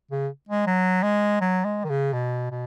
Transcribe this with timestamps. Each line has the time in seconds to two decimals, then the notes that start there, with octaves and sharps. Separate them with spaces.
0.11 C#3
0.49 G#3
0.67 F#3
1.03 G#3
1.41 F#3
1.65 G#3
1.84 D#3
1.89 C#3
2.13 B2
2.51 B2